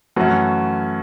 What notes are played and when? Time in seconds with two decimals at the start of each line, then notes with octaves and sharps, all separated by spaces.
0.16 F#2 E3 A3 C#4 F#4